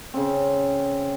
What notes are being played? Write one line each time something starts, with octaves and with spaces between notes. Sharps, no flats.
C#3 C4